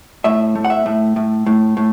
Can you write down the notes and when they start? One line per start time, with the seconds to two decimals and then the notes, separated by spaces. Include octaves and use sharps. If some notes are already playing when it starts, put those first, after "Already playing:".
0.24 A2 E5
0.55 A3
0.65 F#5
0.70 E5
0.86 A2
1.16 A2
1.46 A2
1.77 A2